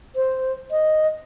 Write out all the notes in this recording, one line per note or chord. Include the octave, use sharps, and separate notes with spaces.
C5
D#5